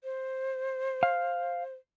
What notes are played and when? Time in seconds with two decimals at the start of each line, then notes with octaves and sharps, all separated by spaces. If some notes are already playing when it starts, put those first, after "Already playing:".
0.04 C5
1.03 F5